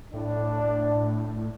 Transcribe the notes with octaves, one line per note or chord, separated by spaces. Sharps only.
A2 D4